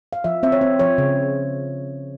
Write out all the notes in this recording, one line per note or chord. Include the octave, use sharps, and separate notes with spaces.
F5
F3 E5
C4 E5
C#5
C4
F3 C#5
C#3